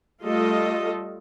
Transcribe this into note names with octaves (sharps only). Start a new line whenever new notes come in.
G3 A3 F4 A4 D#5